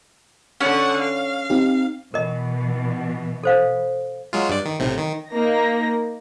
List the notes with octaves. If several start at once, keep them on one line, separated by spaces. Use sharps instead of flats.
D3 C#4 F#5
F5
C4 D#4 G4
B2 E3 A#4 D#5
A4 C5 F5
F#3 G#3 F4
G2 D5
D#3
B1 A2 C3
D#3
A#3 D#4 A#6